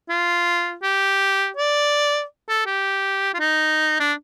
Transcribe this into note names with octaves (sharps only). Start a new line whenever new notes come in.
F4
G4
D5
A4
G4
F4
D#4
D4